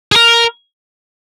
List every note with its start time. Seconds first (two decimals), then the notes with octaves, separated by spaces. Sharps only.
0.12 G#4
0.16 A#4